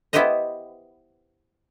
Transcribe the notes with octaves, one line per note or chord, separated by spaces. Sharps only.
B3 E4 G4 B4 C5 D#5